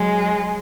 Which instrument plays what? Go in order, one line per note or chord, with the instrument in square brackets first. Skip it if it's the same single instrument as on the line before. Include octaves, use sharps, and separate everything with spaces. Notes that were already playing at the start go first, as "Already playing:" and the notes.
Already playing: [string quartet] F#3 G#3